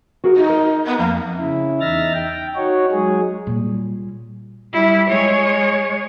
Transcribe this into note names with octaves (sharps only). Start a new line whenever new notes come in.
F#4 G#4 A#4
D#4 D#5
A#4
B3
F2 A#3
C#3 E4
E2 D#4 E5 F6 A6 A#6
G5
D#4 F#4 C#5
F#3 G#3 G#4
A#2 G3
G3 E4
G#3 C#5